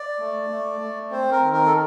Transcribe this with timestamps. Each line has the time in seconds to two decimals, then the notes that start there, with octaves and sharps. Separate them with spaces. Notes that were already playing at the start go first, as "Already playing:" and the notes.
Already playing: D5
0.19 A3
0.50 A3
0.81 A3
1.11 C4 C5
1.31 A#4
1.42 D#3
1.53 A#4
1.66 A4